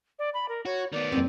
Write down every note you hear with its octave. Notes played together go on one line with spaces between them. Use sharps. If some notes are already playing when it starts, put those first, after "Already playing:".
D5
B5
A#4
F#4 C#5
D#3 B3 D5
F#1 C4